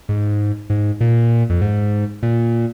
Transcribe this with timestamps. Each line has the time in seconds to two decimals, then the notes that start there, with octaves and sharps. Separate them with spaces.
0.09 G#2
0.70 G#2
1.01 A#2
1.50 F2
1.62 G#2
2.23 A#2